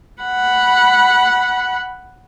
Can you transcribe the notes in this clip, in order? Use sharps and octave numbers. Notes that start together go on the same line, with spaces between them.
F#5 B5